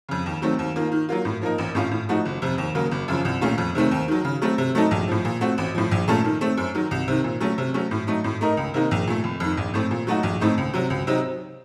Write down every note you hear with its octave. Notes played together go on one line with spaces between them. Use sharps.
F2 C#3
D#2
D#3 F#3 A3 C4
D#2
D#3 A#3 F4
D#3
F#3 A#3 F4
A2
F3 A#3 D#4 A#4
A1
A2 A3 C#4 F4
A2
F3 A3 D#4 F#4
F#1
F2 C3
D#2
C#3 F#3 A#3
F#1
F#2 C#3 F3
C2
A#2 A3 C#4 F4
F2
C3 D#3 A3 C4
D#2
D#3 F#3
C#3
F#3 A3 C4
C3
F#3 A3 D#4 A4
A#1
A2 F3
A#2
A3 C4 F#4
A1
A2 F3
A#1
A#2 A3 C#4 A4
D#3
A3 C4
F#2
D#3 F#3
C2
C3 D#3
A#2
F#3 A3 C#4
C3
F#3 A3 C#4
A2
F#3 A3 D#4
A2
A3 D#4 A#4 D#5
C#2
C3 D#3 A#3 D#4
A#1
A#2 A3
F1
F2 D#3
A#1
A2 A3 C4
A#2
F#3 A3 D#4 F#4
A#1
A2 A3 C4 D#4
C#2
C3 F#3
C#2
C3 F#3 C4 D#4